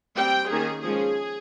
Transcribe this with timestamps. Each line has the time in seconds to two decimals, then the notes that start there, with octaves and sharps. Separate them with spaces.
0.16 G3 C4 G5
0.50 D#3 A#3 C#4 G#4
0.83 F3 G#3 C#4 G#4